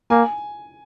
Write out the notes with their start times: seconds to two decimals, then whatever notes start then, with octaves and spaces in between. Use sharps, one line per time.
0.10 A#3 G#5